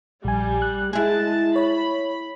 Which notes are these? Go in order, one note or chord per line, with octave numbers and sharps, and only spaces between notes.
A#1 G3 G#5
F#6
G#3 E4 G#4 A5
C#5 B5